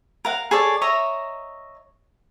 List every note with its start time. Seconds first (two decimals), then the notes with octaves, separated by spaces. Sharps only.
0.25 A#4 F5 F#5
0.51 G#4 A4 C#5 D5
0.82 C#5 D#5 E5 A#5